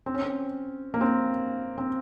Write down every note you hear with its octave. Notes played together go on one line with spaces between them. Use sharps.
C4
C#4
C4
A#3
C4
C4